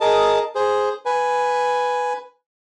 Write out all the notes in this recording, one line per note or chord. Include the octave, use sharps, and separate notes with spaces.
G#4 A#4 D#5 A5
G#4 C5
B4 G#5